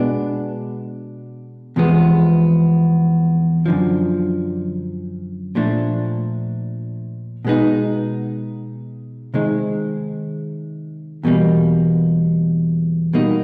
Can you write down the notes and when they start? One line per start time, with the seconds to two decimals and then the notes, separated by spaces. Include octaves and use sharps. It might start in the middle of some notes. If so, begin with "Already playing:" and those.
Already playing: B2 G#3 B3 D4
1.76 E2 C3 F3 G#3 B3
3.66 F#2 D3 F3
5.55 A#2 F3 A3 D4
7.45 B2 G#3 B3 D#4
9.34 C3 D#3 G#3
11.23 E2 B2 G3 A#3
13.13 B2 G3 A#3 D#4